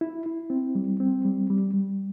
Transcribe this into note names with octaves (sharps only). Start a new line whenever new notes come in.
E4
E4
C4
G3
C4
G3
G3
G3